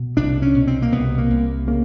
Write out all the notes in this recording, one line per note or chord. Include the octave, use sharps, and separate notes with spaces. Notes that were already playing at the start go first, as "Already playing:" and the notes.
Already playing: B2
C2 D4
C#4
B2
C4
A#3
C2 B3
A#3
C2
C#3 A#3